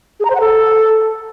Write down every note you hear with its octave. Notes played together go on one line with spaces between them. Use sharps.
G#4
A#5
C5
F#5
A4